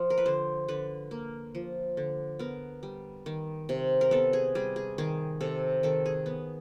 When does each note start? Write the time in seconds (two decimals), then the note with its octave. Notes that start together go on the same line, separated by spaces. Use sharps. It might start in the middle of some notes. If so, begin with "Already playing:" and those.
Already playing: F3
0.10 A#4
0.18 B4
0.26 D3 C5
0.68 D3 B4
1.11 A#3
1.55 F3
1.97 D3
2.39 B3 A#4
2.83 G3
3.26 D#3
3.69 C3
4.01 A#4
4.11 B3 A4
4.33 G#4
4.55 G3 G#4
4.76 G#4
4.98 D#3 G#4
5.41 C3 A4
5.83 D#3 A4
6.06 G#4
6.26 B3